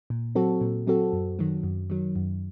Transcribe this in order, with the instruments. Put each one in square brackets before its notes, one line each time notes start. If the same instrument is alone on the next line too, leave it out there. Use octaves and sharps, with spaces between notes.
[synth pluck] A#2
F#3 C4 F#4 A4
A#2
F#3 C4 F#4 A4
F#2
D#3 F#3
F#2
D#3 F#3
F#2